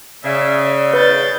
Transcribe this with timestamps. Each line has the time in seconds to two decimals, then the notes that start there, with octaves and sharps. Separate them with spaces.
0.24 C#3 D5 E5
0.94 B4 G6 A6